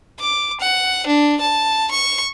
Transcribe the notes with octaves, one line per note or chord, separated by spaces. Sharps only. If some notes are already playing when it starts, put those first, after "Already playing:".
D6
F#5
D4
A5
C#6